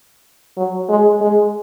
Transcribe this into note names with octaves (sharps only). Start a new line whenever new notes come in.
F#3
G#3
G#3